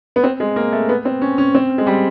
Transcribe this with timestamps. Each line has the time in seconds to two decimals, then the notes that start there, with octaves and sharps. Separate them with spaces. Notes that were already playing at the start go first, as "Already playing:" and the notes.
0.16 B3
0.23 C4
0.40 G#3
0.56 A#3
0.73 A3
0.89 B3
1.05 C4
1.22 C#4
1.38 C#4
1.55 C4
1.78 G#3
1.87 G3